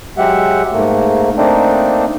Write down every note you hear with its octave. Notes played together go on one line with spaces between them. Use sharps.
F#3 G#3 G4 E5 F#5
G#2 A3 A#3
A3 A#3 C4 D4 D#4